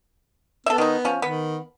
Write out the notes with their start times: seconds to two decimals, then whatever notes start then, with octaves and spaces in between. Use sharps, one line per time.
0.66 B3 A4 E5
0.78 D#3 D#4
1.05 F3 C#4
1.22 D#3 B3